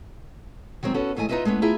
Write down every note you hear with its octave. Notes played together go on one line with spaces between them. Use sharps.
D#3 F#3 G#3 C4
B3 C#4 F#4 A4
G#2 E3 A3 A4 D#5 G#5
D#4 F4 G4 B4 D#5 E5
G#3 A3 B3 C#4
E4 F4 G#4 E5 A#5